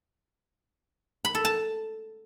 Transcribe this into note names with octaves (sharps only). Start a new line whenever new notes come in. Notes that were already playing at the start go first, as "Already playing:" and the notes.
B5
A4
A5